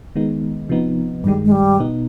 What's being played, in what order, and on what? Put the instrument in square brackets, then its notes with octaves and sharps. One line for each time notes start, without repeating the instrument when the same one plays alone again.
[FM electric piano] D#3 G#3 B3 D#4
C3 F3 B3 D#4
[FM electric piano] G2 D#3 G#3 [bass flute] G3
[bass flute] G#3
G3
[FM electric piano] B2 B3 D#4